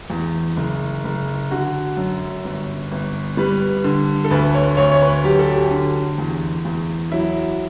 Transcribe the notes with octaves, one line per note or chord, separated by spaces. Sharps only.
E2
F#1
F#1
D3 F#4
F#2
G1
G1
G3 B4
D3
A4
D2 B4
C#5
D2 C#5
C#5
B4
F#3 G4
A4
G4
D3
E2
E2
F#3 E4